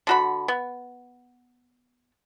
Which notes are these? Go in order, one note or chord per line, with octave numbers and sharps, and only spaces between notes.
D3 F#4 B5
B3